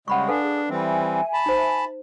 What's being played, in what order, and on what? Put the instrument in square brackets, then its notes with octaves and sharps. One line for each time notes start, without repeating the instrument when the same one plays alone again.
[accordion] C#3 G3 G#3 [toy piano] F#5 B5 C#6
[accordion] D4 [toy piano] A4 B4 F5 [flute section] G#5
[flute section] G#4
[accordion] E3 G3 C4 [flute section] E5 G#5
[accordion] A5 B5
[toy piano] D#4 C5